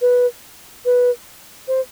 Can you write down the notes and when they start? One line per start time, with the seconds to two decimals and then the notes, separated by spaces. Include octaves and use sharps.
0.02 B4
0.85 B4
1.68 C5